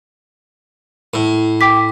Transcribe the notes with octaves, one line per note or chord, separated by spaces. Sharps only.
A2
G5 D6 B6